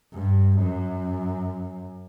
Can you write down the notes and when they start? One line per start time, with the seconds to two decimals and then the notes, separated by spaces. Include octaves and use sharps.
0.14 G2
0.59 F#2